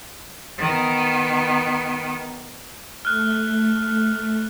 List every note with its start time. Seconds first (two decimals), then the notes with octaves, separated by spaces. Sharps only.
0.59 D#3 B3
3.05 A3 F6 F#6